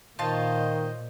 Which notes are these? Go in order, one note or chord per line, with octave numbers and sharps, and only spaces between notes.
A#2 D#3 F4 C5 C#5 D#5 A5